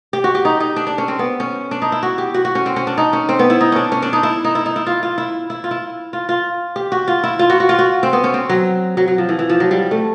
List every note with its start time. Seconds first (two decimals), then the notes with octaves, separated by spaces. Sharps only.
0.13 G4
0.24 F#4
0.35 G4
0.45 D#4
0.60 D#4
0.76 D4
0.87 D4
0.98 C#4
1.08 C4
1.19 B3
1.40 C#4
1.71 D4
1.82 D#4
1.92 E4
2.03 F#4
2.18 G4
2.34 F#4
2.45 F#4
2.55 C#4
2.66 C4
2.76 C#4
2.87 D4
2.98 D#4
3.13 C#4
3.29 C4
3.39 B3
3.50 E4
3.61 D#4
3.72 C#4 D4
3.92 C#4
4.02 D4
4.13 D#4
4.23 E4
4.44 D#4
4.55 E4
4.66 D#4
4.76 E4
4.86 F4
5.03 F4
5.18 E4
5.50 E4
5.64 F4
5.71 E4
6.13 F4
6.29 F4
6.76 G4
6.92 F#4
7.08 F4
7.24 E4
7.39 F4
7.50 F#4
7.60 F#4
7.69 F4
7.79 F#4
8.03 C4
8.13 B3
8.24 C#4
8.34 C4
8.49 F#3
8.97 F#3
9.08 F#3
9.18 F3
9.29 E3
9.39 E3
9.50 F3
9.60 F#3
9.71 G3
9.91 A3